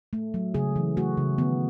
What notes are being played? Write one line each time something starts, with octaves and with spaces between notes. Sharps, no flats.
A3
F#3
C#3 G#4
E3
A3 F#4
C#3
D#3 B3